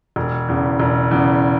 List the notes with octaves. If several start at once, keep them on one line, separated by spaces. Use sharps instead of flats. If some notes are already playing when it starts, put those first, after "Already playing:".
E1
E2 C#3
E1
E2 C#3